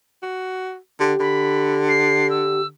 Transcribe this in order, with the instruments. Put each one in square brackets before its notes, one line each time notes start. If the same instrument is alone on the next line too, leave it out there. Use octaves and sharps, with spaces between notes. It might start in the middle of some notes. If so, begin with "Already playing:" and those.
[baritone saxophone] F#4
[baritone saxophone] D3 [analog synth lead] G4
[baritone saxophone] D3 [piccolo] B5
[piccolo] C7
E6